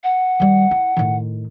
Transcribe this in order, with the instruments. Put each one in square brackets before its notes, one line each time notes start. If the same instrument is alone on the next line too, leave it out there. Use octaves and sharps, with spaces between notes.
[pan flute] F#5
[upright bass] D#3 G3
E4
A2 D#3